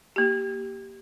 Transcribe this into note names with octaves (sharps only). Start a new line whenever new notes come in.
A#3 G4